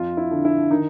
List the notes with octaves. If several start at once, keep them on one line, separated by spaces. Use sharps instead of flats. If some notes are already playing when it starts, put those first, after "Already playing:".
Already playing: F2 F4
E4
D3
E4
D#3 D#4